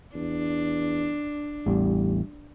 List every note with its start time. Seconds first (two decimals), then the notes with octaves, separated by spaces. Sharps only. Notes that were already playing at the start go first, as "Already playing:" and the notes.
0.15 E2 D4
1.66 A1 E2 G3